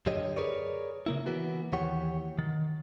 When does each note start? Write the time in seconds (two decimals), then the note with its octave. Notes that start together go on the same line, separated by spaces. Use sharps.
0.06 F#2 D3 G4 C#5 D#5
0.36 G#4 A#4 B4 C#5 D5
1.06 C#3 A#3 E4
1.26 E3 A#3 B3 F#4
1.73 D#2 E3 G4 C#5 F#5
2.39 D#3